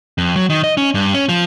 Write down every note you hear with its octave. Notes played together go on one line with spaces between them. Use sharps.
F2
F#3
D#3
D#5
C#4
G2
C#4
F3